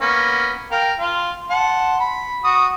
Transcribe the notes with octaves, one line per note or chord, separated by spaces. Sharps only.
A#3 B3 C#4
A#4 F5 G5
F4 F5
F#5 A5 C6
B5
F#4 D#6